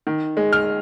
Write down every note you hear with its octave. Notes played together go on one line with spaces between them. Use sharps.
D#3
G#3
F6